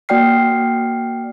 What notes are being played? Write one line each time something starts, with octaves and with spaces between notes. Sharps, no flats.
A#3 F#4 D5 G5 F6 C7